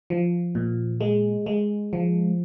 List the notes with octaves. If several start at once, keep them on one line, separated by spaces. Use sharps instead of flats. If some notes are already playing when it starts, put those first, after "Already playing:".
F3
A#2
G#3
G#3
F3